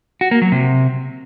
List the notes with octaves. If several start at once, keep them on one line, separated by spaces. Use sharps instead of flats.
F#4
A#3
F#3
C3